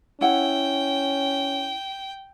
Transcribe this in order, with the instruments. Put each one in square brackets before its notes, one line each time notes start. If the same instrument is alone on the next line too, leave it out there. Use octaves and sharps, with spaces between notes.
[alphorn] C#4 [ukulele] E4 F#5 [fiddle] G5